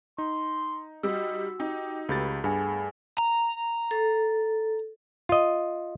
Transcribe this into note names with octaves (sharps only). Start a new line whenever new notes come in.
D#4 C6
G3 F#4 D#5 E6
D#4 G4
C#2 A3 G4 B4 A6
G2 B3 G#4 G#5
A#5
A4
F4 D#5